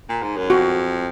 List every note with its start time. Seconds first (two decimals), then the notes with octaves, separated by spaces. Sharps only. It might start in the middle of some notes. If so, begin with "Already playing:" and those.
0.09 A#2
0.22 G#2
0.36 F#2
0.50 F2 F#4